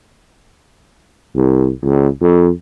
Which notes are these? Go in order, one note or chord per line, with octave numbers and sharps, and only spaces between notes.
C2
C#2
F2